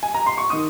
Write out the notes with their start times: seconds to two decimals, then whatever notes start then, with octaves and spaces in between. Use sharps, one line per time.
0.03 G#5
0.14 A#5
0.26 C6
0.38 C#6
0.50 D#3 D#6